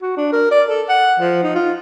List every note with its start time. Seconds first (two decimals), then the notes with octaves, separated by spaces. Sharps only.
0.02 F#4
0.17 D4
0.32 A#4
0.51 D5
0.69 A4
0.89 F#5
1.20 F3
1.43 D#4
1.55 F4